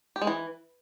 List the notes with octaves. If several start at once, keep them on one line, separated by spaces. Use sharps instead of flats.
G4
G#3
E3